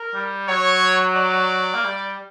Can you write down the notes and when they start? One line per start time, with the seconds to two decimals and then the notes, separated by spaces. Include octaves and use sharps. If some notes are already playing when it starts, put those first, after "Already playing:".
Already playing: A#4
0.15 G3
0.48 F#3 C#5
1.17 D5
1.74 A#3
1.85 G3